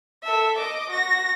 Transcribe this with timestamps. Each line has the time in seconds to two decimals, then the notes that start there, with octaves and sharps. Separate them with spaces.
0.23 A4 E5
0.59 D#5 D6
0.90 F#4 A#6